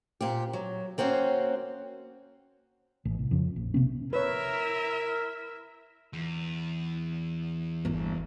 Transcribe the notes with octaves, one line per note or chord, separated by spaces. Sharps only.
A#2 C4 G4
F#3
A#3 C4 C#4 F#4 C5
A1
C2
F2 C#3
A#1
C3 B3 C#4
E4 A#4 B4 C#5 E5
E2
G1 A3